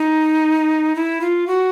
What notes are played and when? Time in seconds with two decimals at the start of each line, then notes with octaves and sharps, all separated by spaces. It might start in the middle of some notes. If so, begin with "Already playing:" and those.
Already playing: D#4
0.96 E4
1.21 F4
1.47 F#4